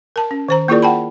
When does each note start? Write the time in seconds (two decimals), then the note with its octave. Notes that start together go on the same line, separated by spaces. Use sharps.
0.16 A#4 A5
0.31 C#4
0.49 D#3 C5 A#5
0.68 A#3 E4 F4 G#4 A#4 D5
0.82 F#5 G5 A5 B5